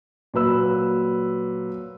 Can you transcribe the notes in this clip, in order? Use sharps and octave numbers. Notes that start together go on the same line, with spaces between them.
A#2 F#3 B4 E6